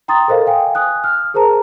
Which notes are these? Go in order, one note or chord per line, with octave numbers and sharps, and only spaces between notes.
G5 A#5 C6 D#6 A6
A4 A#4 C5 D#5 F5
F5 G5 G#5
G#5 D#6 F#6
F6
G#4 A#4 C5 A5 A#5